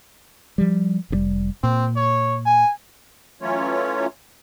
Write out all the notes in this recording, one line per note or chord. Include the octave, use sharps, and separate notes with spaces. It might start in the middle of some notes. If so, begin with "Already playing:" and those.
F3 G3
F1 C3 G3
A#2 C4
C#5
G#5
E3 F#3 A3 C#4 F4 C#5